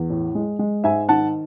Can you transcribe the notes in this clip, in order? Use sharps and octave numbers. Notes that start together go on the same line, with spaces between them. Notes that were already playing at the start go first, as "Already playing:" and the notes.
Already playing: E2
A2
G#3
G#3
G#2 E5 G#5
D#3 F#5 A5